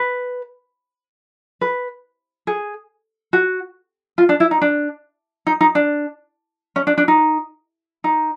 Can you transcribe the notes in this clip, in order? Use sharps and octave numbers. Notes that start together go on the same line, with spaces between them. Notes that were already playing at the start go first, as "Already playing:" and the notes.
Already playing: B4
B4
G#4
F#4
F4
D4
E4
D#4
D4
D#4
D#4
D4
C#4
D4
D4
D#4
D#4